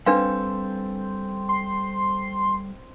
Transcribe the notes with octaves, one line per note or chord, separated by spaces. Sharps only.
G3 C4 D4 A4 B4 F5
C6